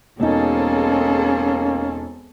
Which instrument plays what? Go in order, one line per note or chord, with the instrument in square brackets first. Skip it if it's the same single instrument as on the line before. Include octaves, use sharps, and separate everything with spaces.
[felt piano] E1 D#4 [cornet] A#3 [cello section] C4 G#4 A4 [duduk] C#4